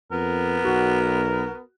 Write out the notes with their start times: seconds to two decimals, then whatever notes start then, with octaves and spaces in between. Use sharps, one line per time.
0.12 F2 B3 A#4
0.64 B1 F#4